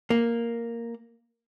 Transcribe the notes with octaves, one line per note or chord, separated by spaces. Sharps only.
A#3